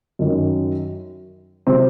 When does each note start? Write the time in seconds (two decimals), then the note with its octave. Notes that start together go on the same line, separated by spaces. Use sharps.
0.19 F#2 D#3 F#3 C#4
1.67 C3 F#3 C4